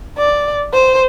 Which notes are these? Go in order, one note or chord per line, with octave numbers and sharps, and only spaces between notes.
D5
C5